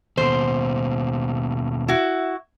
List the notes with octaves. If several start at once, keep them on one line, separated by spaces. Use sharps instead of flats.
D#2 B2 C5
E4 F#4